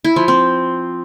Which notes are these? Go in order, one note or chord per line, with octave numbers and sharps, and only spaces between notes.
E4
F3
C4